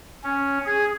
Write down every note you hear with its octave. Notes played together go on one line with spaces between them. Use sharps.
C#4
G#4